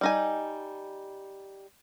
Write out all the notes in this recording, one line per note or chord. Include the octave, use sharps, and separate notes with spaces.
G3 D#4 G#5